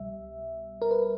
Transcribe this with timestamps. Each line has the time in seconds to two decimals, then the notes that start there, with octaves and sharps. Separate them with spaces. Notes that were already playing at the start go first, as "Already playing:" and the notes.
Already playing: C2 B2 G3 E5
0.82 A#4
0.91 B4